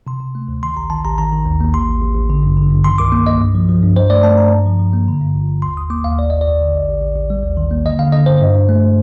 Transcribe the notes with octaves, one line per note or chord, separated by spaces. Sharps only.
C3 C6
C3
A3
D2
D#3 C6
A1 A#5
D#3 A5
A1 A#5
D#3 A#5
D#3
D#2
A#3
A1 C6
A1
A1
A1
D3
G2
D3
G2
D#3 C6
C2 D6
A#3
C2 D#5
G2
F3
F3
G2
G2 C5
A3 D5
A3 A5
G2 A#5
G2
F3
F3
A#3
D3
G2
G1
G1
D#2 C6
D#2 D#6
A#3 D6
D#2 F5
G1 D5
G1 D#5
D5
F2
D3
A1
A1
A1
A1
G3
D#2
D#3
A#3
D3 D#5
D3 F5
D3 D#5
G2 C5
G2
G2
A3